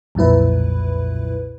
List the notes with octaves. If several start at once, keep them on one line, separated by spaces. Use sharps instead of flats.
B1 F2 A#2 E4 B4